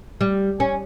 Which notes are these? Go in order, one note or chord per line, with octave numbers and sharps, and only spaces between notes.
G3
C#4